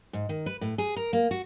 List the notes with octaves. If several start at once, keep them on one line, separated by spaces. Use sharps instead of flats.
G#2
D#3
B4
A2
G#4
A#4
A#3
F#4